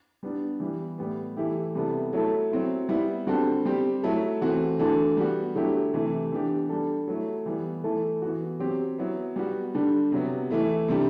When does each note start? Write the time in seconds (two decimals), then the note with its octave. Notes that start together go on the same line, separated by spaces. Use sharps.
0.23 G3 B3 D4
0.60 E3 G3 B3
0.98 A2 G3 B3
1.37 E3 A3 E4 G4
1.75 C3 G3 B3 E4 A4
2.13 F#3 A3 E4 A4
2.51 F#3 C4 E4
2.89 G3 B3 E4
3.27 D3 G3 C4 F#4 A4
3.65 G3 C4 G4
4.03 F#3 A3 E4 A4
4.41 E3 A3 C4 F#4
4.79 E3 A3 D4 F#4 A4
5.17 G3 B3 F#4
5.55 D3 F#3 A3 E4 G4
5.94 C3 E3 A3
6.32 E3 B3 D4 G4
6.69 G3 D4 A4
7.08 F#3 A3 E4
7.46 E3 G3 B3
7.84 E3 A3 E4 A4
8.22 E3 B3 F#4
8.59 F#3 C4 G4
8.98 F#3 B3 E4
9.36 G3 B3 F#4
9.74 D3 G3 D4
10.12 C3 F#3 B3
10.51 E3 A3 E4
10.88 C3 G3 D4 G4